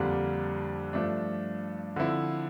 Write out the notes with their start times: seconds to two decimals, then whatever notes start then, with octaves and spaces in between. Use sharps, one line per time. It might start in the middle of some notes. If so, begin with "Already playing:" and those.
Already playing: F2 D3 G3 A#3 D4
0.93 G2 F3 A3 D4
1.96 D3 F3 C4 E4